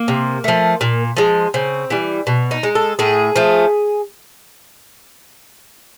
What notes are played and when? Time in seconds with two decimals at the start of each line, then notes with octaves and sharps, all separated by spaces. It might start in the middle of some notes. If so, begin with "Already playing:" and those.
Already playing: A#3
0.08 C3
0.44 F3 A3
0.81 A#2
1.17 F3 G#3
1.54 C#3 C4
1.90 E3 G3
2.27 B2
2.51 D#4
2.63 G#3
2.75 A4
2.99 A2 G#4
3.36 F3 A3